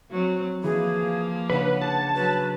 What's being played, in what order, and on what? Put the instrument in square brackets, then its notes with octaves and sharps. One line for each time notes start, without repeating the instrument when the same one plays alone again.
[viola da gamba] F#3 C4
[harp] E3 [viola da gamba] F3 A#3 [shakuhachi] G#4
[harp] C#3 D4 [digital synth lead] B4 [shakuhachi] F#5
[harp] G#4 [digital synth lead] A5
[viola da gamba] F#3 [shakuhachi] B4